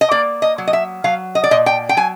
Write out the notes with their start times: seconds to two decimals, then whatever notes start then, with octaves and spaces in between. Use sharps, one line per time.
0.01 D#5
0.11 A#3 D5
0.42 D#5
0.58 F#3
0.67 D#5
0.73 E5
1.04 F#3 F5
1.35 D#5
1.44 D5
1.51 A#2 D#5
1.66 G5
1.89 G5
1.97 F#3 G#5